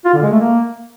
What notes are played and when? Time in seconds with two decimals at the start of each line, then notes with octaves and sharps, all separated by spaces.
0.05 F4
0.14 D3
0.23 G#3
0.31 A3
0.40 A#3